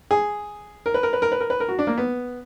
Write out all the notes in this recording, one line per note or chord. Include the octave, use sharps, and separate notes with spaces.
G#4
A#4
B4
A#4
B4
A#4
B4
A#4
B4
A#4
F#4
D4
A#3
B3